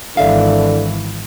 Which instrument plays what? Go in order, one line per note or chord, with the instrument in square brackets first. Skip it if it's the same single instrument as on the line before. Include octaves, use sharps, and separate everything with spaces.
[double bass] G#1 E3 [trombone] D3 [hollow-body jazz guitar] E5 F5